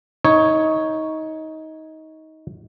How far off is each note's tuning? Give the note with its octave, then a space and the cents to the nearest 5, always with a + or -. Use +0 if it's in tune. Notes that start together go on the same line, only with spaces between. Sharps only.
D#4 +20 C#5 +0